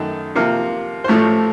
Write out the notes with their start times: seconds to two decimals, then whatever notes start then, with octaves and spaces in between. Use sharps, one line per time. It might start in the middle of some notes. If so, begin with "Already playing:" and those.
Already playing: F#2 D#3 A3 D#4
0.35 C3 F3 A#3 F4
1.04 C5
1.08 A1 A2 F3 A3 C#5